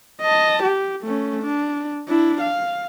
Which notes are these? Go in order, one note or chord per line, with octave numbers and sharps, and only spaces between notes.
D#5 A5
G4
A3 C#4
D4
D4 E4
F5